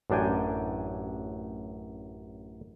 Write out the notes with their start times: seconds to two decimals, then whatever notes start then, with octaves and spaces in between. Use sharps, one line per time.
0.10 A1 F#2 D4 G5 G#5